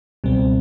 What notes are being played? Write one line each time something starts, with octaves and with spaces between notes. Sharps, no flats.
C#2 B2 G3 C4